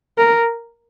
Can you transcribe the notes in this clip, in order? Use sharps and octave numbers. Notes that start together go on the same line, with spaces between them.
A#4